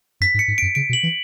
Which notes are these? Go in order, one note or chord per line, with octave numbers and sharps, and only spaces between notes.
F#2 B6
G#2
C#7
G#2
F#2 D7
C#3 D7
B2
F#7
E3